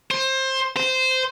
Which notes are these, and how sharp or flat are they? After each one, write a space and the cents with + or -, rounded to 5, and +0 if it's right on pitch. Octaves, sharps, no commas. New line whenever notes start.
C5 +20
C5 -15